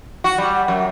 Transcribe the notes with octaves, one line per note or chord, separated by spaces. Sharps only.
F#4
G3
F#2